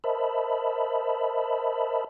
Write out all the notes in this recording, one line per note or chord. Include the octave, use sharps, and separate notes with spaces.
A#4 C5 D#5 E5 A5 B5